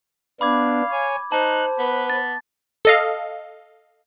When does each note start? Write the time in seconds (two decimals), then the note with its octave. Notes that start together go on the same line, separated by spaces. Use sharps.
0.41 B3 D4 F5 B5 D6 G#6
0.91 C#5 G#5
1.32 D#4 C5 A5 F#6
1.79 B3 B4
2.10 A6
2.85 A4 D#5 F5